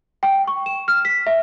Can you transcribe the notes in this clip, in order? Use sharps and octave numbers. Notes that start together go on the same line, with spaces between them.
G5
C#6
E7
F6
B6
E5